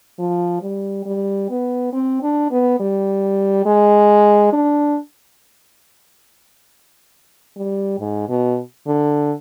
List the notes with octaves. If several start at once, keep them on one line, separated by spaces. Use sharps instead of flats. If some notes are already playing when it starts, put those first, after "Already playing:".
F3
G3
G3
B3
C4
D4
B3
G3
G#3
D4
G3
G#2
B2
D3